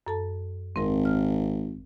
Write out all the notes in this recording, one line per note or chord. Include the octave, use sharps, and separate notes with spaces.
F#2 A4 A5
G#1 C4 A#4
F6